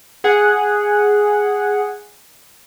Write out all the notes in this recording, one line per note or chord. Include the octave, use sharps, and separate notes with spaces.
G#4 F#5